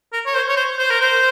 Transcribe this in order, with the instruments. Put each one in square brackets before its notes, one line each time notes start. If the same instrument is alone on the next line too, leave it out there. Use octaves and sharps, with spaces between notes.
[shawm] A#4
C#5
C5
C#5
C5
C5
A#4
C5